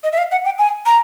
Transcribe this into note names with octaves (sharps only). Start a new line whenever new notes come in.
D#5
E5
F5
F#5
G5
G#5
A#5